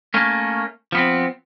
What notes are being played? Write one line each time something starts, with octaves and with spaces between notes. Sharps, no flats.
A3 A#3 C#4
F3 B3 C4